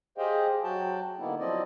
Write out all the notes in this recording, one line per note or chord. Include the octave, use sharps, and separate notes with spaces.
G4 G#4 C5 D#5 F5 G5
F#3 F#4 G5 A5
D3 A#3 B3 D#4 E4
F3 F#3 C4 E4 D5 D#5